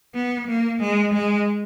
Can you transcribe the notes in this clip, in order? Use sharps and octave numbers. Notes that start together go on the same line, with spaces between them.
B3
A#3
G#3
G#3